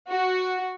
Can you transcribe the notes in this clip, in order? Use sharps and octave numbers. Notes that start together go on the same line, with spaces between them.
F#4